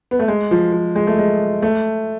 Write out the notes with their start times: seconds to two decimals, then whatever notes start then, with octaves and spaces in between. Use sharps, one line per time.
0.11 B3
0.19 A3
0.28 G#3
0.51 F3
0.72 F3
0.95 G#3
1.07 A3
1.18 G#3
1.62 A3